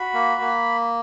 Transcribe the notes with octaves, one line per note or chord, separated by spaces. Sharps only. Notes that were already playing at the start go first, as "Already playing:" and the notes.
Already playing: F#4 B5
A#3
A#3